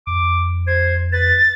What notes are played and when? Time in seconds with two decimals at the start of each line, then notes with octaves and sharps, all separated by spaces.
0.07 F2 D6
0.67 C5 G#6
1.12 B4 A6